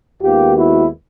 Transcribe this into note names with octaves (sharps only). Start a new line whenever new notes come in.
D#2 D#3 G#3 B3 F4 G4
E4 F#4